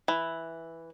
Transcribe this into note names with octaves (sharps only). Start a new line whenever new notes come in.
E3